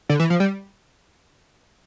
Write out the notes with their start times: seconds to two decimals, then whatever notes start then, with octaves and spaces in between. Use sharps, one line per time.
0.09 D3
0.20 E3
0.30 F3
0.40 G3